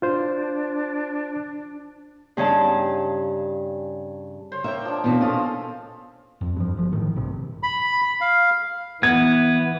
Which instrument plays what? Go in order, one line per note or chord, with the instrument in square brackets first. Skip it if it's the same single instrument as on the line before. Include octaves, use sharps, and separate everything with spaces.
[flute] D4 [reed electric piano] F4 C5
[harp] G2 C#3 C#4 D#4 A5
[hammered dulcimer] C5 C#5
[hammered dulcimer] A#3 C#5 G5 [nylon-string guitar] E5
[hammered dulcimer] F3 D4
[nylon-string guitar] E2 B2 C4
[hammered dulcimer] C#4 F4 A4 [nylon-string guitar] D#5
[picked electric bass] F2
G2 F3
G1 F3
A2 D#3
A#1 G2 C3
[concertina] B5
F5
[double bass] E3 [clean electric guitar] B3 [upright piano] G#6